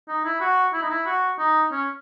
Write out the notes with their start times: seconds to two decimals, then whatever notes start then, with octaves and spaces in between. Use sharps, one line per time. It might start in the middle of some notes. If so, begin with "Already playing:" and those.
0.08 D#4
0.25 E4
0.41 F#4
0.73 E4
0.82 D#4
0.90 E4
1.06 F#4
1.39 D#4
1.71 C#4